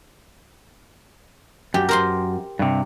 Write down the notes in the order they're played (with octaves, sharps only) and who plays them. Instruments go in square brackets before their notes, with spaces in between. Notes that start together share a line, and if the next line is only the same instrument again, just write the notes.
[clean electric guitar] F#2 [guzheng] G4
[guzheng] A#4 C5 C6
[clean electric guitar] G2 C3